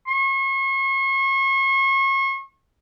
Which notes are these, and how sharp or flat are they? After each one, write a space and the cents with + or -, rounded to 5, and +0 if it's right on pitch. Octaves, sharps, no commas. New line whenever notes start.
C#6 -40